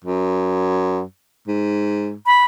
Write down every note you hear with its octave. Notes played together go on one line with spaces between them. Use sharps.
F#2
G#2
B5